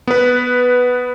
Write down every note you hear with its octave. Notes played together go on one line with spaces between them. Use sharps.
B3 B4